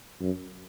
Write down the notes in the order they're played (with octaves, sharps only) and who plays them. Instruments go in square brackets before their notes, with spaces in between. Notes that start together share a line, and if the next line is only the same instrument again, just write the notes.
[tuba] F#2